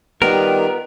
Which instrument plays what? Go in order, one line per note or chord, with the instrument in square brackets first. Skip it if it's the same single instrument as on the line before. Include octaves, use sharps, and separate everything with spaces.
[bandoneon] D#3 [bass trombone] G3 [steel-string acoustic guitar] B3 F4 B4 [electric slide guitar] A#4